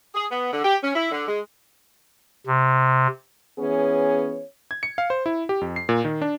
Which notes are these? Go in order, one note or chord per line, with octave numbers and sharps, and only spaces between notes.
G#4
B3
D3
G4
C#4
E4
D3
G#3
C3
E3 B3 C#4 G#4 C#5
G#6
C#7
F5
C5
E4
G4
F2
C7
A#2
D#3
D4